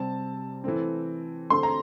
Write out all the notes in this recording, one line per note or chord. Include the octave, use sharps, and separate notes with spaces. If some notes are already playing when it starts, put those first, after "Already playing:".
Already playing: C3 G3 C4 A5
E3 A3 C4
D3 A3 C4 C6
A#5